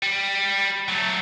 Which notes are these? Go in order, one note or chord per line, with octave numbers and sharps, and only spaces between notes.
G3
F#3 A3